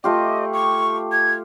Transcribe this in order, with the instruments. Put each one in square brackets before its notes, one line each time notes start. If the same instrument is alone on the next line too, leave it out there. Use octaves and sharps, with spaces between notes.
[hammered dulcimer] A3 F4 G4 [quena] D#5
[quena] C#6
G#6